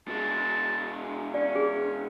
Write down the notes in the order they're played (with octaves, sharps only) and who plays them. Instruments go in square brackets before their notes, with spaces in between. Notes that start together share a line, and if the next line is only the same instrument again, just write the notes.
[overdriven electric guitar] B2 G#3 [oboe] A5
[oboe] C#4 [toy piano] D5
[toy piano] G#4